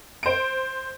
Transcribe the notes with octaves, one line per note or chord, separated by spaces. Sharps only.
C5 D7